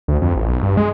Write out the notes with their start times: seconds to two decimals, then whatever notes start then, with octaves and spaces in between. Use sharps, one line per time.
0.08 D2
0.21 F2
0.36 A1
0.49 B1
0.63 G2
0.77 G#3